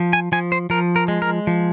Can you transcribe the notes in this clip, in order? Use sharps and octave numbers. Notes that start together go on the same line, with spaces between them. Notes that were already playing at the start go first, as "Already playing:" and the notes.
Already playing: F3
G#5
F3 G#5
C5
F3 A#4
A#4
G#3
A#4
F3